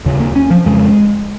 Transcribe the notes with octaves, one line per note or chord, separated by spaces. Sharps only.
D#2 C#3
A#3
C#4
F3
F2 C#3 G#3